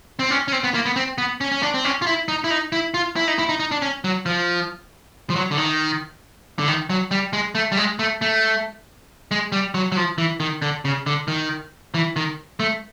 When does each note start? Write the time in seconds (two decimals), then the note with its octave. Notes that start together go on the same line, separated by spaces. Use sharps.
0.19 C4
0.31 C#4
0.48 C#4
0.52 C4
0.64 B3
0.74 A#3
0.85 B3
0.96 C4
1.18 B3
1.41 C#4
1.52 C#4
1.63 D4
1.74 C4
1.85 C#4
2.02 F4
2.07 E4
2.28 D#4
2.44 E4
2.50 D#4
2.72 E4
2.94 F4
3.16 E4
3.28 D#4
3.39 E4
3.49 D#4
3.59 D#4
3.71 D4
3.82 C#4
4.04 F#3
4.26 F3
5.30 F3
5.36 F#3
5.51 D3
5.57 D#3
6.59 D3
6.67 D#3
6.90 F#3
7.11 G3
7.33 G#3
7.55 A3
7.72 G3
7.77 G#3
7.99 A3
8.22 A3
9.31 G#3
9.52 G3
9.74 F#3
9.92 F#3
9.97 F3
10.18 E3
10.40 D#3
10.62 D3
10.85 C#3
11.06 D3
11.28 D#3
11.94 E3
12.16 D#3
12.60 A3